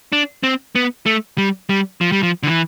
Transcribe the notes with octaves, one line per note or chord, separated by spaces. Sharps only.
D4
C4
B3
A3
G3
G3
F3
G3
F3
D3
E3